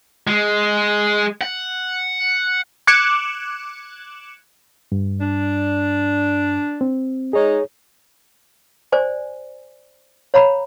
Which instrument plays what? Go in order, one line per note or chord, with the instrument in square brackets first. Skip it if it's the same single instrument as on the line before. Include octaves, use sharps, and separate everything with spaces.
[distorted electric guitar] G#3
F#5
[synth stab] D6 F#6 G#6 C#7 E7
[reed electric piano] G2
[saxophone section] D4
[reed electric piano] C4
[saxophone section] G#3 D#4 [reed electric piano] G#4 C#5
[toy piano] C5 D5 G#5
C#5 F5 A#5 B5